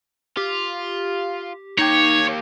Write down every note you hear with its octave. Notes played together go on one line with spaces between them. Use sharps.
F4 G4
A#3 D#4 G4 C#5